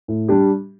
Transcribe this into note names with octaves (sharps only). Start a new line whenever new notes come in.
A2
G3 D4 G4